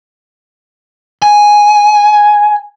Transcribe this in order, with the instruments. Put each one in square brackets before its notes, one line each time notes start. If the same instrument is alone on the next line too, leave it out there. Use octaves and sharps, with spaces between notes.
[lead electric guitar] G#5